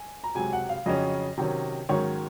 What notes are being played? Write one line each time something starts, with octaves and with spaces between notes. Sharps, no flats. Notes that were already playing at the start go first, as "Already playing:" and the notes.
Already playing: G#5
A#5
C#2 C3 F#3 G#5
F#5
F5
F2 C#3 F#3 C#4 D#5
C3 D#3 F#3 C#4
G#2 D#3 F#3 C#4 C#5